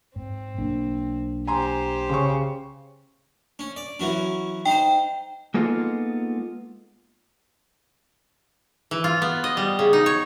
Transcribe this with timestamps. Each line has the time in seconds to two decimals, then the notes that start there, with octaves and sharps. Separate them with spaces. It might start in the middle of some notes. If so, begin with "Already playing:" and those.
0.16 G#2 C4
0.58 B1 A#3 D4
1.47 G4 C5 G#5 A#5 C6
2.09 C#3 C6 C#6
3.59 C#4
3.76 D5
3.99 E3 F#3 C#4
4.66 D#4 C5 G5
5.54 G#3 A#3 B3 D#4 F4 A4
8.91 E3
9.04 F4
9.22 B3
9.44 D#5
9.57 G3
9.79 C#3
9.93 D#4
10.06 C#5